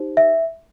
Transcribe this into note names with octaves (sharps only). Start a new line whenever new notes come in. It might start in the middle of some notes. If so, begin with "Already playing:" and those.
Already playing: D#4 G4 C5
E5